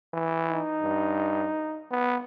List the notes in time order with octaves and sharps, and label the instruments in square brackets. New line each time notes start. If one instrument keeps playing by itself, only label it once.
[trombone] E3
[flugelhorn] D#4
[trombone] G2
B3